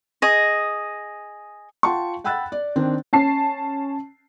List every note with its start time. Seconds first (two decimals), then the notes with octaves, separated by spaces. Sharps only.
0.22 G#4 D#5
1.83 F4 F#5 G5 A5 C6 C#6
2.24 F#5 G5 B5 E6 F#6 A6
2.52 D5
2.76 D#3 C4 D4
3.13 C#4 A5 C7